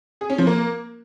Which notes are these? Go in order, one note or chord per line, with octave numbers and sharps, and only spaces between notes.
G#4
C#4
F3
A#3